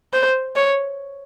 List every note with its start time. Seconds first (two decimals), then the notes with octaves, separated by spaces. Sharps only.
0.13 C5
0.56 C#5